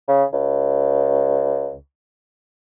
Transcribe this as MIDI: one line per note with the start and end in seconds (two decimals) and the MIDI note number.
0.08 0.24 49
0.33 1.77 37